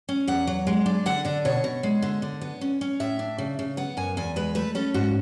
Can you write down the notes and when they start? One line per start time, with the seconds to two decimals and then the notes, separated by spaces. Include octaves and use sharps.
0.09 C#4
0.28 E2 F#5
0.47 F#3
0.67 G#3
0.86 D4
1.06 D3 F#5
1.25 D3 D5
1.45 B2 C#5
1.64 B2
1.83 G#3
2.02 D3
2.22 D3
2.41 B3
2.61 C#4
2.81 C#4
3.00 A2 E5
3.19 D4
3.38 C#3
3.59 C#3
3.77 B3 F#5
3.97 F#2 G#5
4.17 E2 G#5
4.36 G#3 B4
4.55 A3 B4
4.75 C#4 A4
4.94 G#2 F#4